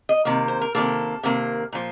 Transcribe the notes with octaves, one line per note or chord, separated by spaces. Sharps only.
D#5
C3 D#3 A#3
C5
A#4
C3 D#3 A#3 A4
C3 D#3 A#3
A#2 F3